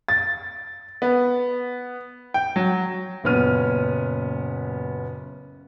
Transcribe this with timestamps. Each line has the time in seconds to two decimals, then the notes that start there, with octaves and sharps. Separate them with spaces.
0.09 A6
1.02 B3
2.34 G5
2.56 F#3
3.24 F#1 A#2 B3 C#4 F6 D#7